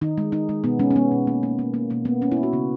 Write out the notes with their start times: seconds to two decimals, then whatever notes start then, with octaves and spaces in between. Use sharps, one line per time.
0.02 D#3 D#4
0.18 G#3
0.32 G#3 D#4
0.49 G#3
0.64 B2 B3
0.79 G#3 C#4
0.91 C#4
0.96 G#3 B3
1.11 B2
1.27 A#3
1.43 A#3
1.59 A#3
1.74 A#3
1.90 B2 A#3
2.05 A#3 B3
2.22 A#3 C#4
2.32 E4
2.37 A#3
2.43 F#4
2.53 C#3 B3